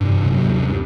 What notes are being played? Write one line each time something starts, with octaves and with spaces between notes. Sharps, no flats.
G2 C3 E3
D#2 C3 F#3
G2